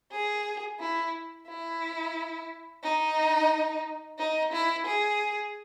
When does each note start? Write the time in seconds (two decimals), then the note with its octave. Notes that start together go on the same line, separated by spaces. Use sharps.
0.12 G#4
0.79 E4
1.48 E4
2.83 D#4
4.19 D#4
4.52 E4
4.86 G#4